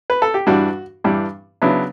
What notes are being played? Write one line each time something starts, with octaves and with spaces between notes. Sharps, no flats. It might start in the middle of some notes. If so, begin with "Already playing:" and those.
B4
A4
G4
G2 E3 G3 D4 F#4
G2 E3 G3 D4
C#3 F#3 B3 D4 E4